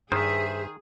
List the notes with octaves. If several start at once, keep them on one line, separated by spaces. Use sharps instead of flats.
G2 D#3 G#4 C5 E5